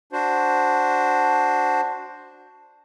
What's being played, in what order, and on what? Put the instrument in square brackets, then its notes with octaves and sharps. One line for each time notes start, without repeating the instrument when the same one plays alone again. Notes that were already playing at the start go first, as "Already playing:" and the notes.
[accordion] D4 F#4 C5